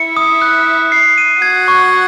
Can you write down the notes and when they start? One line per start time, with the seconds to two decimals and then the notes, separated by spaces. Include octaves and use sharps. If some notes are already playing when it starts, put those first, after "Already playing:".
Already playing: E4 E5 C#7
0.17 D#6
0.42 F#6
0.67 D#6
0.92 C7
1.18 D#7
1.42 F#4 F#5 G#6
1.68 C#6